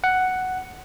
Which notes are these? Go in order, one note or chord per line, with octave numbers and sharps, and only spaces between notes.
F#5